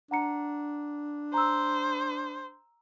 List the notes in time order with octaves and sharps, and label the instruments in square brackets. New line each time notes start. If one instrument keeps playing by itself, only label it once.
[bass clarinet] D4 [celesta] F#5 A#5 C#7
[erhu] C5 [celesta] A#5 E6